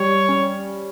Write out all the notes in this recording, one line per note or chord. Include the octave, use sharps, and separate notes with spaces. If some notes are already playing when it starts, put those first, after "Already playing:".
Already playing: G3 C#5
C#4